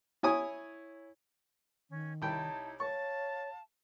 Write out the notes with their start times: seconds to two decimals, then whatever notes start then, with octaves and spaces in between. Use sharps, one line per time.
0.23 E4 C#5 G#5 D#6
1.90 D#3 C#4
2.22 C2 D#4 E4 C#5 G5 A5
2.80 C#5 F5 A5 C#6 A6